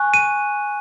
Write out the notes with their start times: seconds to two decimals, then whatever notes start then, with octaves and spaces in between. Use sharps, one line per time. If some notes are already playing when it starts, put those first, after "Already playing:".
Already playing: G#5 C#6 F#6
0.14 D#7